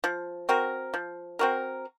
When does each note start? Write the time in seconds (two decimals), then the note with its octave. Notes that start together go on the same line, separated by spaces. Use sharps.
0.04 F3
0.49 C4 F#4 A#4
0.94 F3
1.39 C4 F#4 A#4